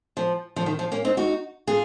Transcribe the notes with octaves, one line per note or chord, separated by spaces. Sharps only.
F3
F3
D#3
F3
A#3 C#4
C4 D#4
D#4 F#4
F4 G#4